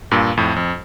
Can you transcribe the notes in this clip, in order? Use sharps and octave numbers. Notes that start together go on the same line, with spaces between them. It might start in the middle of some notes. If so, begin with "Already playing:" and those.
G2 A#2
F2 A2
F2